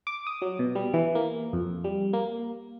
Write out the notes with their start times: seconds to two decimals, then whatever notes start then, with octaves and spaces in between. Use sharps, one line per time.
0.07 D6
0.27 D#6
0.42 F#3
0.59 B2
0.75 G3
0.94 E3
1.15 A#3
1.53 F2
1.84 G3
2.13 A#3